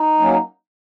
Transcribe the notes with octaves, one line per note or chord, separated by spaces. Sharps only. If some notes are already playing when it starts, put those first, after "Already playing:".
Already playing: D#4
F#3 A#3 C#4